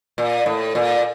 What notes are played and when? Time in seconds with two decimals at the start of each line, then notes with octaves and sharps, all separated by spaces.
0.18 A#2
0.46 A2
0.75 A#2